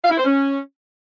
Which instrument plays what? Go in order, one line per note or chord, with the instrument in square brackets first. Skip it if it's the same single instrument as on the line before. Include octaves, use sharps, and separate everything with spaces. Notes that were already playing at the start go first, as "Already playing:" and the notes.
[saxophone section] F5
E4
C5
C#4